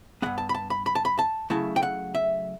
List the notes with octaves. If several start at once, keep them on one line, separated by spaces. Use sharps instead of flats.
G2 E3 B3 F#5
A5
B5
A5
B5
B5
A5
B5
A5
C#3 F#3 A3 E4 A5
G5
F#5
E5